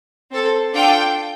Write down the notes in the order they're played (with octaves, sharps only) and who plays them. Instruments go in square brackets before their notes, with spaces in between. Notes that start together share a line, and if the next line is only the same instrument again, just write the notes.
[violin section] C4 A4
D4 F4 A4 G5